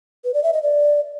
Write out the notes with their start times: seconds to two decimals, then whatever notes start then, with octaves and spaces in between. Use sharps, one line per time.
0.24 B4
0.34 D5
0.43 E5
0.53 D#5
0.63 D5